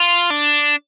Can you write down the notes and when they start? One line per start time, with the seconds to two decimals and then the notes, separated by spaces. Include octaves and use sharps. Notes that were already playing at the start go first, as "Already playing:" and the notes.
Already playing: F4
0.30 D4